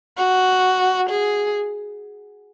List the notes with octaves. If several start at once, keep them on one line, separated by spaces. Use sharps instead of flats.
F#4
G#4